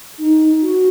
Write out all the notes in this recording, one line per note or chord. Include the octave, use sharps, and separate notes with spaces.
D#4
F#4